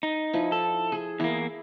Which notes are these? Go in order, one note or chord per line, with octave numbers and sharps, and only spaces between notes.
D#4
F3 E4
A4
G#4
E2 A#3 E4